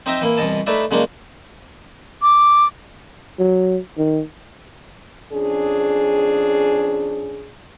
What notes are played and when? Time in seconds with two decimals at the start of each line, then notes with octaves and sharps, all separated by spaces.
0.06 C4 D#4 D#5 E5 G5 A#5
0.21 E3 A#3 E4
0.37 C2 B2 E3 D#5 A5
0.67 A3 D#4 E4 B4 D5 E5
0.91 C#3 F#3 G#3 A#3 D4 D#4
2.22 D6
3.39 F#3
3.98 D#3
5.32 F2 C#4 D4 G#4